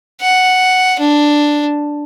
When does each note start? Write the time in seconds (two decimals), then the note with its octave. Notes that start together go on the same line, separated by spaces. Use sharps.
0.21 F#5
1.00 D4